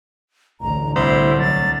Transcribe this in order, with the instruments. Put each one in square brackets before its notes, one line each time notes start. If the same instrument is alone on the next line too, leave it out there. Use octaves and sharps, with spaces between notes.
[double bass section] A1 D2 D3 [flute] A#5
[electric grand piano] C2 [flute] E4 [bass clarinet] C5
[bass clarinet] F#3 [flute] A6